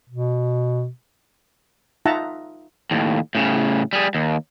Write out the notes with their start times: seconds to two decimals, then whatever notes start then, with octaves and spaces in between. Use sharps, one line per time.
0.10 B2
2.06 D#4 F4 E5 F#5 A5 A#5
2.91 D#2 A2
3.35 A2 C#3
3.93 G3 G#4
4.15 D#2